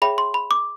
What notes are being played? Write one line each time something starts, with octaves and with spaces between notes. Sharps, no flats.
G#4 C#5 E5 G5 B5
C6
B5
D6